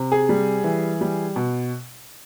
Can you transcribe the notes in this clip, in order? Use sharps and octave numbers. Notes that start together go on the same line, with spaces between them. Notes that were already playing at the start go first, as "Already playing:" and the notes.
Already playing: C3
G#4
G3
E3
G3
B2